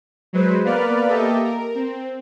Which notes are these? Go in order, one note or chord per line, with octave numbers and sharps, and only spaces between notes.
F#3 G#3 B4 C5
A#3 B3 B4 D5 F6
A#3 G4 A4 D#5 E5
A#4
C4